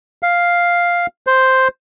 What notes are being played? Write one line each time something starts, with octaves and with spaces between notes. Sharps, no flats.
F5
C5